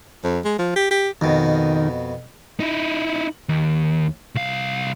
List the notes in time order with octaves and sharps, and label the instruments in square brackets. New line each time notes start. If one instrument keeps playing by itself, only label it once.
[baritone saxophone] F2
G#3
F3
G4
G4
[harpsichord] F2 B2 [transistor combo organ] D#3
[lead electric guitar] D#4 E4
D#2
C2 F5